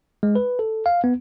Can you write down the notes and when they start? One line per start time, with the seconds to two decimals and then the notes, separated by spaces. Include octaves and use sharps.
0.23 G#3
0.36 B4
0.59 A4
0.86 F5
1.04 B3